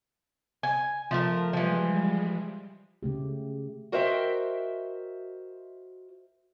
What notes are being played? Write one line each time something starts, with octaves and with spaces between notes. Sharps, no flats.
G#5
F3 A3 A#4
E3 F3 G3 G#3
C#3 A3 G4
F#4 A#4 C5 D#5 E5 G5